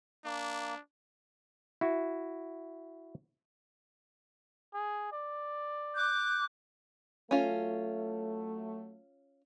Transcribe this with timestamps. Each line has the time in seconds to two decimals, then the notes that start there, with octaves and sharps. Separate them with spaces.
0.25 A#3 D4
1.81 E4 F#4
4.74 G#4
5.12 D5
5.95 D6 F#6 G6
7.31 F#3 A3 C#4 F4